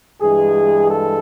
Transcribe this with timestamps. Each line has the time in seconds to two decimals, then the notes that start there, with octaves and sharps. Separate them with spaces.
0.21 G2 E3 G#3 G#4
0.90 A4